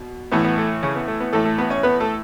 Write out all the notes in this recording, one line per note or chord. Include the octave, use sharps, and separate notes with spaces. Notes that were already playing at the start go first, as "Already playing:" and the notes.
Already playing: B2
A2 E3 B3
B3
A3
C#3 C#4
B3
A3
B3
A2 E3 A3 A4
A3 A4
B3 B4
C#4 C#5
B3 B4
A3 A4